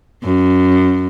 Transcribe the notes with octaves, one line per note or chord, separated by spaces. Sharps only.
F#2